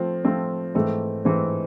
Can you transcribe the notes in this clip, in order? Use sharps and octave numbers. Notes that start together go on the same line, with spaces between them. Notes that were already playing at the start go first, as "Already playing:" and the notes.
Already playing: F3 A3 C4 F4
F3 A3 C4 F4
G#2 E3 A3 C4
G#2 E3 A3 C4